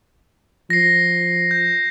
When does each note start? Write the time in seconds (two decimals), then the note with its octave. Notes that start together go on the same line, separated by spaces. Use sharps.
0.70 F3 A#6 C7
1.51 G6